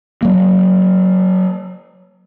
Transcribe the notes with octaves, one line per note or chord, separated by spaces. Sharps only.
F#3 A#3